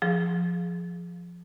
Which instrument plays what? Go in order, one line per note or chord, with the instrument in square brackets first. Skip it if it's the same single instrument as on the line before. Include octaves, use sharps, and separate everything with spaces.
[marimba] F3 G#4